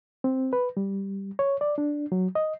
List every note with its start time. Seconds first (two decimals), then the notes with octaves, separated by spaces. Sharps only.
0.24 C4
0.53 B4
0.77 G3
1.39 C#5
1.61 D5
1.78 D4
2.12 F#3
2.35 D#5